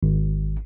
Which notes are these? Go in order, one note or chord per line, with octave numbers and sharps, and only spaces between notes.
G#1